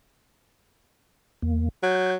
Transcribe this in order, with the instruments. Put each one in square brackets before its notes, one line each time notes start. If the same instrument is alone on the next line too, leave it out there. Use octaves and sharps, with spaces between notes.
[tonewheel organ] E2 A#3
[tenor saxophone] F#3 [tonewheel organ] G6